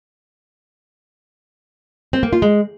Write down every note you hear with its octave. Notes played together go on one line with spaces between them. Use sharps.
C4
A#3
F4
G#3